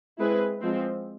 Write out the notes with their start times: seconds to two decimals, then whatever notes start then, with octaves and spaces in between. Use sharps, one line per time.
0.19 G#3 C4 E4 G#4 B4
0.61 F3 G#3 C4